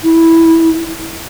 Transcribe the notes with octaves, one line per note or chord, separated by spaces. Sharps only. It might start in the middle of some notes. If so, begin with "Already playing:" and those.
E4